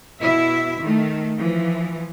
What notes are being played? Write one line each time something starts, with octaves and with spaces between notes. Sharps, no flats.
B2 E4 E5
D#3 A3
E3 F3